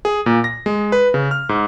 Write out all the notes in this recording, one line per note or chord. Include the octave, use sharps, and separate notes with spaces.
G#4
A#2
A#6
G#3
B4
C#3
F6
G#2